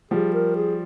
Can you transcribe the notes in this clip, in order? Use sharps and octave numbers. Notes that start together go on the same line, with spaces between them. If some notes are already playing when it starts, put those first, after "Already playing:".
F3 G3 G#4
A#4
G#4